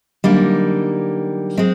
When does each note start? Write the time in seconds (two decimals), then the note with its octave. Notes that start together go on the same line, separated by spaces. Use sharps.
0.24 D3 F#3 G3 A#3 D#4
1.57 F#3 G#3 C4